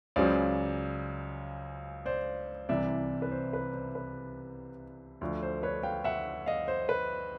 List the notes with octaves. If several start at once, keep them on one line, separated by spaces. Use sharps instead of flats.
C#2 C#3 F#3 C5 D5
C5 D5
C2 C3 E3 D5 E5
B4
C5
B4
C5
B4
D2 D3 F3
C5
B4 C#5
F5 G5
E5 F#5
D#5 F5
C5
B4